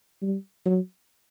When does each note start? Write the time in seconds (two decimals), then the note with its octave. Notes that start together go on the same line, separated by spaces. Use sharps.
0.22 G3
0.66 F#3